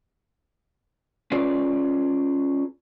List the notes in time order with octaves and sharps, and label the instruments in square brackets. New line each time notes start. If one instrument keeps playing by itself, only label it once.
[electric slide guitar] C#4 F4 G#4 B4 D5